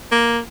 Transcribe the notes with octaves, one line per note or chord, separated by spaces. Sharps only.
A#3